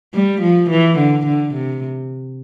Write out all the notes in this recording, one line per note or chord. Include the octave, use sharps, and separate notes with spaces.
G3
F3
E3
D3
D3
C3